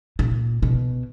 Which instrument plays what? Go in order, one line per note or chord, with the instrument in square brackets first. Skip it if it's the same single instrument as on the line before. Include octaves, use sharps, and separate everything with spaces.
[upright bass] A#2
B2